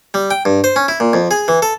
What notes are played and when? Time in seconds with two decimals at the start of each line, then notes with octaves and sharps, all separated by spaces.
0.14 G3
0.31 G5
0.45 G2
0.64 C5
0.76 C#4
0.88 E4
1.00 A#2
1.13 F2
1.31 G#4
1.48 E3
1.62 A4